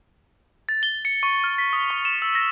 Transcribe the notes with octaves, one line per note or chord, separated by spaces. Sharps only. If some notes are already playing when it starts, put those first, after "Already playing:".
A6
G7
C#7
C#6
F6
B6
D#6
C#6
E7
E6
A#6